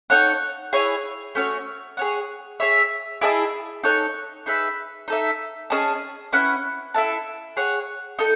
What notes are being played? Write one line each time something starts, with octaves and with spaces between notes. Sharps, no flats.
D#4 A4 C#5 F#5
E4 G#4 C#5 G#5
A3 C#4 F#4 C#5
G#4 C#5 F#5
G#4 C#5 E5
E4 G#4 D#5 A5
D#4 A4 C#5 F#5
D#4 G#4 B4 E5
D#4 A4 E5
C#4 G#4 D#5 A5
C#4 E4 B4 F#5
E4 A4 E5 A5
G#4 C#5 F#5
D#4 A4